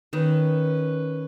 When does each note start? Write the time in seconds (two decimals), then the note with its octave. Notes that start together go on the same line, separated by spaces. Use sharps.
0.13 D#3 C#4 B4